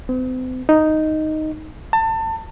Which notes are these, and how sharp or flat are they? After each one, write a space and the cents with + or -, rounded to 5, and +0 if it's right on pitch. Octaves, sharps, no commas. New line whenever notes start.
C4 -40
D#4 +0
A5 +30